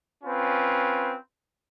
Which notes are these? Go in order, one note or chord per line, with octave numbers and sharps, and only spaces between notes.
C4 C#4 F4 B4